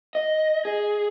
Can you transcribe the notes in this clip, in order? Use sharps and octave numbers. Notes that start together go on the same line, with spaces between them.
D#5
G#4